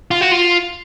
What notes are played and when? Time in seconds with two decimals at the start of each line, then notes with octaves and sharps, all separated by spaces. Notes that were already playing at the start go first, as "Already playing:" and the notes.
0.11 F4
0.21 F#4
0.31 F4